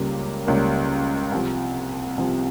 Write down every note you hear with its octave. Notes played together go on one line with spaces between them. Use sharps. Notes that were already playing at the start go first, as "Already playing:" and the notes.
Already playing: C#2 C#3 G3 A#3
C#2 C#3 G3 A#3
C2 C3 F3
C2 C3 F3